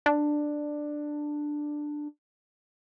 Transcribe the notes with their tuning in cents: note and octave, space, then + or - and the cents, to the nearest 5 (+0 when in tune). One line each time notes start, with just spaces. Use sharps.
D4 +10